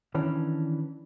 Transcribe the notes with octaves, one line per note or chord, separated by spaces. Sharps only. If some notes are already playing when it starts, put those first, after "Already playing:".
D#3 E3 C#4 D4